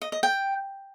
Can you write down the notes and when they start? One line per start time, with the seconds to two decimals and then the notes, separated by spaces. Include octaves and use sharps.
0.02 D#5
0.12 D#5
0.23 G5